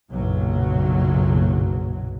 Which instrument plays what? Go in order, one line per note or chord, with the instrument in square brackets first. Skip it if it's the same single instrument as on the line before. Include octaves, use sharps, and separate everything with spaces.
[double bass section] F#1 B1 A#2 F#3